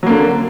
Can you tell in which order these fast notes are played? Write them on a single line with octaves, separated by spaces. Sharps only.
F#3 A#3 D3